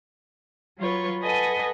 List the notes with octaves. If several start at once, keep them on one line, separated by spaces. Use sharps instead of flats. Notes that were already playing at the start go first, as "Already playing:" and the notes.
F#3 F4 B4 C#5
A4 B4 D#5 F#5 G#5